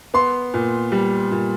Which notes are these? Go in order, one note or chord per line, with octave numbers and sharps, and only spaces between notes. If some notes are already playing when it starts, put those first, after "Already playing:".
B3 C6
A#2
G3
A#2